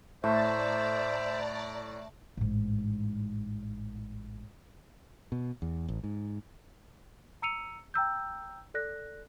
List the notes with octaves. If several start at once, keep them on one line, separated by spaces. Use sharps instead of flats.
A2 A3 C5 D5 E5 A5 A#5
A1 G#2
B2
E2
A1
G#2
A#5 E6 C#7 D#7 F7
G5 A#5 E6 G6
A4 D5 F#6 A#6